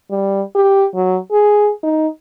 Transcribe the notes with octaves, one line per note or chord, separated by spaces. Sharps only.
G3
G4
F#3
G#4
D#4